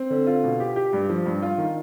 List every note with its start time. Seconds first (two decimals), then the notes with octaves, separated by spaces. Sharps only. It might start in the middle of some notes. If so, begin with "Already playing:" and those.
Already playing: C4
0.10 D3
0.27 F4
0.44 B2
0.60 G4
0.76 G4
0.93 G2
1.09 F3
1.26 G2
1.42 F4
1.58 D#3